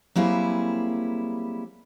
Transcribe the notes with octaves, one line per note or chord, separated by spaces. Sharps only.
F#3 G3 A#3 C4 E4 G#4